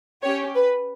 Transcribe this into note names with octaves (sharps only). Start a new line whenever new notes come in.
C#4 G4 C#5
B4